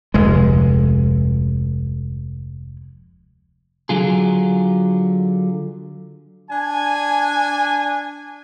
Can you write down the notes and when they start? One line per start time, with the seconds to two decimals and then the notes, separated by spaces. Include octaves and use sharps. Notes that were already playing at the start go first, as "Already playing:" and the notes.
0.14 F1 D2 G#3
3.89 D3 F#3 F4 G#4
6.50 D4 G#5